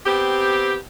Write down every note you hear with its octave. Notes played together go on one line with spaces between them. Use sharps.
B3 C4 G4